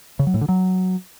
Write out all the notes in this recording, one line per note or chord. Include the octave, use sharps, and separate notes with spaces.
C#3
F#3
A2
D3
F#3